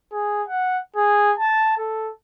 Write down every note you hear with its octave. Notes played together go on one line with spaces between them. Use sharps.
G#4
F#5
G#4
A5
A4